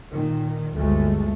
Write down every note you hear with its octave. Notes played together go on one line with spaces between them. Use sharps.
A#2 D#3
G1 D2 G#3 A3